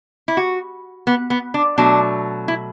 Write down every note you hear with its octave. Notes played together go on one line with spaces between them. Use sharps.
E4
F#4
B3
B3
D4
B2 F#3 A3 D4
E4